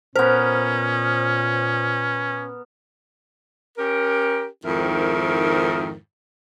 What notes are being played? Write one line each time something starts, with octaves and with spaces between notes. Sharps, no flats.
A#2 B3 C#4 A#4 C5
C#4 G4 A#4
F2 G#2 D#3 E4 A#4